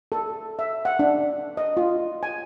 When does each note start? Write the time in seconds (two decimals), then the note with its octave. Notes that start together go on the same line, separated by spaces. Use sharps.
0.12 A4
0.59 E5
0.85 F#5
0.99 D4
1.57 D#5
1.77 F4
2.23 G#5